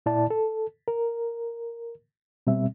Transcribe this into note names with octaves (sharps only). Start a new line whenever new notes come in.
A#2 E4 D5 A5
A4
A#4
B2 G3 C4 E5